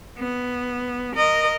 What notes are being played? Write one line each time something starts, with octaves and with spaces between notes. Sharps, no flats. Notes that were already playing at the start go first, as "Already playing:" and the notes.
B3
A#4 D#5